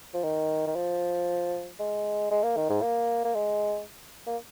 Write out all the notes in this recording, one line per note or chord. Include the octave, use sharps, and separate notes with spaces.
F3
D#3
D#3
F3
G#3
G#3
A#3
D#3
G#2
A#3
A#3
G#3
A#3